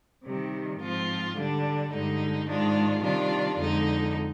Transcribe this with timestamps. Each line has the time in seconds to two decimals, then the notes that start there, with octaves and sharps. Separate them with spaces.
0.24 C3 D#3 G3
0.80 G#2 F3 C4 F4
1.36 D3 G3 D4
1.91 G2 D3 G#3 D#4
2.47 G#2 D#3 G#3 D4 F4
3.03 C3 D#3 G3 D4 F4
3.59 F2 D3 G#3 D#4